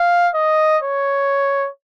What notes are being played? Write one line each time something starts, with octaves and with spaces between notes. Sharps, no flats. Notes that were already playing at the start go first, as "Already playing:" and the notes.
Already playing: F5
D#5
C#5